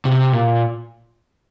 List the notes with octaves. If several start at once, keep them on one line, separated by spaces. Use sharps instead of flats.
C3
A#2